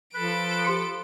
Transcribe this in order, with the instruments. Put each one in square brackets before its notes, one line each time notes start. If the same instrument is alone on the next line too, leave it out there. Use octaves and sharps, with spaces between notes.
[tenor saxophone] F3 [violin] A4 D7 [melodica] B4 B5
[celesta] G4 C6 C#7